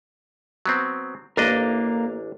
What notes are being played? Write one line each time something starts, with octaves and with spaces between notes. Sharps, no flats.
F#3 B3 C4
A1 A#3 D4 A#4 D#5